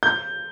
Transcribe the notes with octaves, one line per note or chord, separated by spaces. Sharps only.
G6